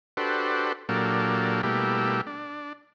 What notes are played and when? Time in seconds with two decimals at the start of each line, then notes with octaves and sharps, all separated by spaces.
0.17 D4 F#4 G4 A4 B4 C5
0.89 A#2 F#3 A#3 D4 G4 A4
1.63 B2 G3 A3 A#3 E4 G4
2.27 D4